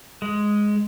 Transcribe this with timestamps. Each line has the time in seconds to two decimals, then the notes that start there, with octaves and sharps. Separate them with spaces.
0.22 G#3